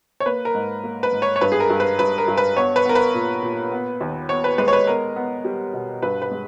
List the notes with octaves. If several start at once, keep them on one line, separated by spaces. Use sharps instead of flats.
C#5
A#3 B4
A#4
G#2
A#3
B4
G#2
C#5
C#5
G2 B4
G#4
A#4
G2
B4
G2 B4
A#4
G2
B4
B3 C#5
B4
B3 A#4
B4
A#2
A#2
B3
D#2
B3 C#5
B4
G#3 B4
C#5
B4
B3 A#4
B3
G3
B2
G2 B4
B4
G#3